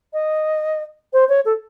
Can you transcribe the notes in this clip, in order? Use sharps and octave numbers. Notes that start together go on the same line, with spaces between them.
D#5
C5
C#5
A4